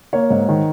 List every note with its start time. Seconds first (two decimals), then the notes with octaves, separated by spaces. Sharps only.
0.13 A#3 C#5
0.30 G#2
0.48 D#3